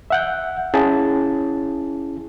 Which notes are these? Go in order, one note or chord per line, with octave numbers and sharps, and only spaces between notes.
E5 F#5 G6
C#4 E4 G#4 A5